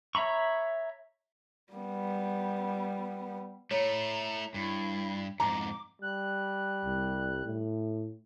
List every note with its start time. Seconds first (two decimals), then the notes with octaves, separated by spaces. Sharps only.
0.15 C#5 E5 A#5 B5 C#6
1.73 G3 B3
3.71 A3 E4 C#5 A#5
4.54 G2 E4
5.40 F2 G#2 A#5 D6
6.02 G3 F#6
6.84 C2
7.45 A2